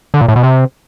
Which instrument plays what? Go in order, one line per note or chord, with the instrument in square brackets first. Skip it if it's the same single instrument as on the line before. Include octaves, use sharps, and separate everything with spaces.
[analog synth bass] D3
A#2
A2
B2
C3